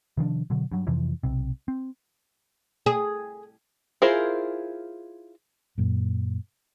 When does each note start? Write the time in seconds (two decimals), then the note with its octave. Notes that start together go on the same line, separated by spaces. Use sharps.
0.17 C3 D#3 F3 D4
0.50 B2 D3 F#3
0.72 G2 F#3
0.87 F2 C3 E3 F3
1.23 B1 C3
1.68 C4
2.86 G#4
4.02 E4 F4 G#4 A#4 C5
5.78 F#2 A#2